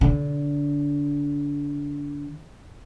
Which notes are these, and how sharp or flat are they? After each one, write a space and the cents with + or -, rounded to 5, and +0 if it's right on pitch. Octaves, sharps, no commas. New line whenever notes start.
D3 -25